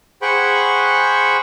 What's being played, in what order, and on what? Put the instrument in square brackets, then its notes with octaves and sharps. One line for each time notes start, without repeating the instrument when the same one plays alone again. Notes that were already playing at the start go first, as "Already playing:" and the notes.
[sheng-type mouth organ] G#4 C5 F#5 G5 B5 C#6